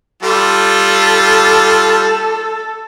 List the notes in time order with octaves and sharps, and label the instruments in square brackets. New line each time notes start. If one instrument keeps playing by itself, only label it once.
[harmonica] G3 F4 [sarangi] A4